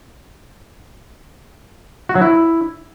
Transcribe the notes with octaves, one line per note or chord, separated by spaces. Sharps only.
F#4
F#3
E4